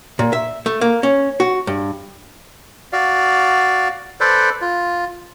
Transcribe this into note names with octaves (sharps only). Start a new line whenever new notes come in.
A#2
E5
A3
A#3
C#4
F#4
G2
F#4 D5 F5
A4 B4 C5 D5
F4